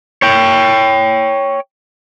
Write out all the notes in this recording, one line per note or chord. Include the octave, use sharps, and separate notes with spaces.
C#5 G5